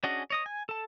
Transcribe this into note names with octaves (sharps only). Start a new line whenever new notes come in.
C#4 D4 F#4 G#4 D#5
C#5 D#5 D#6
G#5
A4 A5